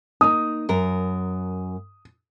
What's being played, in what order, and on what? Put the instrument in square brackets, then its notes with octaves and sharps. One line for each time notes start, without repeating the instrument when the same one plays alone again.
[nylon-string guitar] A#3 D#4 [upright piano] D#6
[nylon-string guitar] F#2 A#4